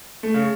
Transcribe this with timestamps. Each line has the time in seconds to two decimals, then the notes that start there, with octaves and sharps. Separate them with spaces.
0.23 A3
0.34 C#3